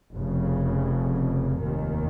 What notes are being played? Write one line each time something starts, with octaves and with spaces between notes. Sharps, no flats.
F1 F2 C#3
F1 D#2 D#3